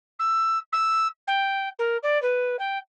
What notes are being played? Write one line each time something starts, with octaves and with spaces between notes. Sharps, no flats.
E6
E6
G5
A#4
D5
B4
G5